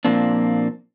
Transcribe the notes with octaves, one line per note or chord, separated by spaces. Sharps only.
A#2 F3 A#3 C4 D4